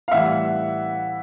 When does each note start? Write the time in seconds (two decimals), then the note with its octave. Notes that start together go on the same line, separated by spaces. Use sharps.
0.08 F5
0.11 A2 E3 G3 E5 F#5